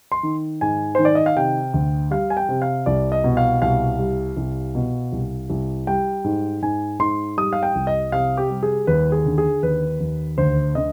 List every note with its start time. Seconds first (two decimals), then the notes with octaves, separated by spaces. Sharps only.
0.12 C6
0.23 D#3
0.61 G#2 G#5
0.95 D#3 C5
1.05 D5
1.15 D#5
1.26 F5
1.36 C3 G5
1.74 D2
2.11 G3 F5
2.30 G#5
2.37 G5
2.49 C3
2.62 F5
2.86 C2 D5
3.12 D#5
3.24 B2
3.37 F5
3.62 C2 F5
3.99 G3
4.37 C2
4.75 B2
5.12 C2
5.50 C2
5.87 G3 G5
6.24 G#2
6.62 G#2 G#5
6.99 G#2 C6
7.38 G3 D#6
7.53 F5
7.63 G5
7.75 C2
7.87 D#5
8.12 C3 F5
8.37 G4
8.50 G3
8.63 G#4
8.87 D#2 B4
9.12 G#4
9.26 D3
9.38 G#4
9.63 D#2 B4
10.00 D#2
10.38 D2 C5
10.75 D3 D#5